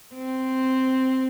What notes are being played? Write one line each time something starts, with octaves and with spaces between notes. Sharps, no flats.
C4